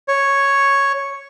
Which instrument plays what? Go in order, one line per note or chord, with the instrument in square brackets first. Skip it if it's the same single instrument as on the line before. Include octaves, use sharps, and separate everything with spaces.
[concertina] C#5